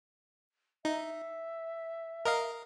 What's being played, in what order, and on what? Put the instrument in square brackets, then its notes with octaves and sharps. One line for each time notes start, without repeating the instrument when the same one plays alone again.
[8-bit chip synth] D#4 [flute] E5
[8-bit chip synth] A#4 D#5 F5